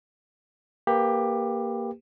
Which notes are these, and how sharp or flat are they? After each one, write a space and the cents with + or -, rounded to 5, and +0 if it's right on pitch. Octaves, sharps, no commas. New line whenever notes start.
A#3 +0 G4 +15 B4 +0